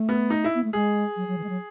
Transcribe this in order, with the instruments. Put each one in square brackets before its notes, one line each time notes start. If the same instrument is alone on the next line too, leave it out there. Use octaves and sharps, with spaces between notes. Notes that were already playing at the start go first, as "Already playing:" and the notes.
Already playing: [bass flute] A3
[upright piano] B3
D#4
E4
[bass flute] B3
A3
[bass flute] G#3 [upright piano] G#4
[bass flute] F#3
F#3
E3
G#3
F#3